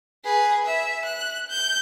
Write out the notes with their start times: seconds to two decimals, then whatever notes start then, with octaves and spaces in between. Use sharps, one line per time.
0.24 G#4 B4
0.66 E5
1.05 F#6
1.50 G6